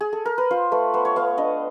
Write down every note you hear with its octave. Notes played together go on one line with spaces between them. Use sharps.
G#4
A4
A#4
B4
F4 C5
A3 B4
B3 C5
C#5
B3 F5
D4 D#5